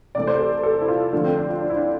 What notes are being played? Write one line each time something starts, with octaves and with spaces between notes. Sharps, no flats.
C3 E3 A3 D5
C5
A4
A4
E4
F4
D3 F3 A3 D4
C4
D4
F4
D4
E4
D4